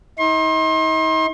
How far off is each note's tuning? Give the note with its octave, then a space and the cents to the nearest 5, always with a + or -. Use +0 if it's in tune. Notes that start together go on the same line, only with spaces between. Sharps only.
D#4 +40 C6 +35